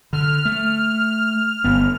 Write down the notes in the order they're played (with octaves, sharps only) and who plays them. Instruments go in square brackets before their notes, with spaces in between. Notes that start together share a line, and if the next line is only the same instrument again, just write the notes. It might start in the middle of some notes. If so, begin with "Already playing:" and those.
[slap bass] D3 [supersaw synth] F6
[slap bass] A3
G1 B3